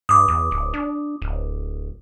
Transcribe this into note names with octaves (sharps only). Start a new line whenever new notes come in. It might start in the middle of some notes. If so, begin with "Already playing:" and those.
G2 D6 D#6
E2
D1
D4
D1